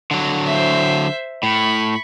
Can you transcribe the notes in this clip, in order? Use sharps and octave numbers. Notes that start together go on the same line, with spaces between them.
D3 F#3
C5 E5
A2 B5 C#6